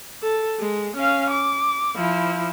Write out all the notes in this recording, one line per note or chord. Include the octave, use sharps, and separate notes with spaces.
A4
G#3
C#4 F5
D6
F3 E4